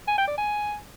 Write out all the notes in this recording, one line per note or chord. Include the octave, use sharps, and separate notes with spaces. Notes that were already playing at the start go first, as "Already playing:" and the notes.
G#5
G5
D5
G#5